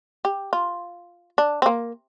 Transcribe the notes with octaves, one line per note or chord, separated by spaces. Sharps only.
G4
F4
D4
C4
A#3